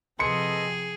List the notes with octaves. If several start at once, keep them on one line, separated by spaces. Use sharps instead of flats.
C3 F3 G#4 A4 B4 D#5 C6 C#7